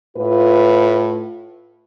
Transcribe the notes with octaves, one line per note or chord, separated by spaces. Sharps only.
A2 F4 B4